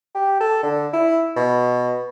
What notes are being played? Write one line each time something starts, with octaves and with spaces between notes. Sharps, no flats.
G4
A4
D3
E4
B2